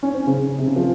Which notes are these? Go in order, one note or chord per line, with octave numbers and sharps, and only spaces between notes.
C#4
C4
C#3
C#3
C3
C#3
F3